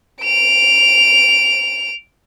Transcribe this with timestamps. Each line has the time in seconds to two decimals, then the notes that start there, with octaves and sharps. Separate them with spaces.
0.22 D7 F7